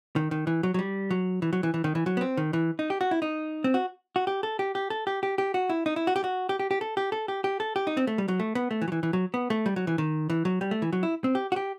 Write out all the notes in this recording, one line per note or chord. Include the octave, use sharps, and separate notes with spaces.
D#3
D#3
E3
F#3
F#3
G3
F#3
E3
F#3
E3
E3
D#3
E3
F#3
B3
C4
D#3
E3
D#4
G4
F#4
E4
D#4
C4
F#4
F#4
G4
A4
G4
G4
A4
G4
G4
G4
F#4
E4
D#4
E4
F#4
G4
F#4
G4
G4
G4
A4
G4
A4
G4
G4
A4
G4
D#4
C4
A3
G3
F#3
A3
B3
A3
E3
F#3
E3
E3
F#3
B3
A3
G3
F#3
E3
D#3
E3
F#3
G3
A3
E3
F#3
E4
C4
G4
F#4
G4